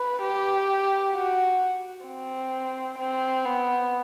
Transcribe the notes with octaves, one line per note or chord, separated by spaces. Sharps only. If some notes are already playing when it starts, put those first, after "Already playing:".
Already playing: B4
G4
F#4
C4
C4
B3